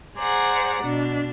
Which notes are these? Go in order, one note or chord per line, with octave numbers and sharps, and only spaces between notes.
G#4 C5 D5 F#5 A#5
B2 D4